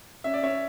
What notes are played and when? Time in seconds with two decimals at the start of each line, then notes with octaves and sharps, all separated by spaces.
0.24 C#4 E5
0.34 D5
0.43 C#4 C#5 E5